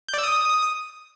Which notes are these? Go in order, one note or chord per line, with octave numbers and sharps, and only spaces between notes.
G6
D5
E6
D#6